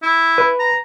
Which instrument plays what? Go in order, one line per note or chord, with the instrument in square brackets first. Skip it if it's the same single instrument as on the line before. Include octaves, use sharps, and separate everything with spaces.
[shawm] E4
[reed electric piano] B4
[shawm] A#5